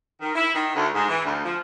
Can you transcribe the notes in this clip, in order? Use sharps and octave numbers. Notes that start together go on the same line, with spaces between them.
D#3
E4
D#3
D2
G#2
E3
D2
F3